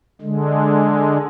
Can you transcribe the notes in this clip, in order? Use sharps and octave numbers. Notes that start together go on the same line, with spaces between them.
D3 G#3